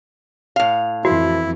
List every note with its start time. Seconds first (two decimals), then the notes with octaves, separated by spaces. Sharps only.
0.56 A2 F5
1.05 F2 E3 E4 F#4